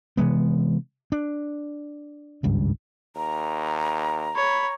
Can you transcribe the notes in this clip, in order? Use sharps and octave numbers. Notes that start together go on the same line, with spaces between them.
C3 E3 G#3 B3
D4
G#1 C#2 G2
D#2 A#5
C#5 B5